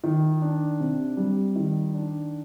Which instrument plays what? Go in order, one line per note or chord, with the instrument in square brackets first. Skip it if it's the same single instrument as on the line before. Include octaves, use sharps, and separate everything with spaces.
[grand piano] D#3
D4
C3
G3
D#3
D4